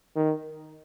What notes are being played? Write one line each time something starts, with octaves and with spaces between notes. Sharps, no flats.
D#3